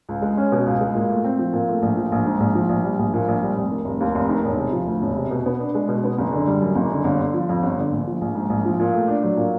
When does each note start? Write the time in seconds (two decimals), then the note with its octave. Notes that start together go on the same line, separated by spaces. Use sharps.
0.09 C#2
0.22 G#3
0.37 C#4
0.52 B2
0.66 C#2
0.81 G#3
0.95 A#2
1.10 A3
1.24 C4
1.39 F3
1.53 A#2
1.68 A3
1.82 A#1
1.97 F3
2.12 A#1
2.26 G#2
2.40 A#1
2.55 F3
2.69 A#1
2.84 G3
2.99 A#1
3.14 A#2
3.28 A#1
3.42 G3
3.57 F1
3.71 D#3
3.85 F1
4.00 D#2
4.15 F1
4.29 D#3
4.44 E1
4.58 C3
4.72 F3
4.87 D2
5.02 E1
5.16 C3
5.31 B2
5.46 B3
5.60 D4
5.75 G#3
5.88 B2
6.04 B3
6.18 F#1
6.32 D3
6.47 G3
6.61 F#2
6.75 F#1
6.91 D3
7.04 G1
7.19 D3
7.34 F3
7.49 F2
7.63 G1
7.78 D3
7.93 A#1
8.07 F3
8.21 A#1
8.35 G#2
8.50 A#1
8.65 F3
8.80 A#2
8.94 A3
9.08 D4
9.23 F#3
9.37 A#2